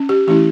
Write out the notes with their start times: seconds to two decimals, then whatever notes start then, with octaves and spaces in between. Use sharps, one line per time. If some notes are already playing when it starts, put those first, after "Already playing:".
Already playing: C#4
0.09 G4
0.27 E3 A3 C#4 E4 G4